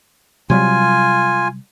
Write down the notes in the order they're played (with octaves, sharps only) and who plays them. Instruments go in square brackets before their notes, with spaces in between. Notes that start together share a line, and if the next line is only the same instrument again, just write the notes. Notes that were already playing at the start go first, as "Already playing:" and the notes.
[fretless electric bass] C3 F#3 G3 [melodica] F4 G#5